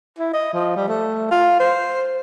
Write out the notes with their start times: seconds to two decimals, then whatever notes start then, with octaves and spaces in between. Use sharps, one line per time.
0.19 E4
0.33 D#5
0.54 F3
0.76 G3
0.88 A3
1.31 F4
1.60 C5